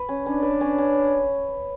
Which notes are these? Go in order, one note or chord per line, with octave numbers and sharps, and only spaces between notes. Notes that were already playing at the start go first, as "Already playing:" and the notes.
Already playing: B4
C#4
C#4 D4
B4
C#4
C#4